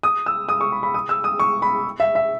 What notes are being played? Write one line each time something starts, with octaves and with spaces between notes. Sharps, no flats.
D#6
E6
D#6
C#6
B5
B5
D#6
E6
D#6
C#6
B5
E5
E5